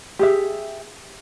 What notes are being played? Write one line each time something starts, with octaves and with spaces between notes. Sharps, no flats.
G4 G#4 E5